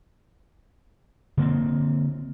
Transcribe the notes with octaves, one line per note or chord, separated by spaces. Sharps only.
D3 A#3 C4